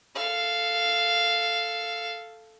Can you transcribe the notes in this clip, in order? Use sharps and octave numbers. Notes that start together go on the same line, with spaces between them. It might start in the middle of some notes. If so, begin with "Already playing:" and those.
A4 F5